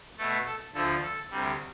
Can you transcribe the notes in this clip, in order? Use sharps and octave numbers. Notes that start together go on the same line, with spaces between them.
B2 A3 A4
A4
D2 D3 F3 A4
A4
D2 C3 G3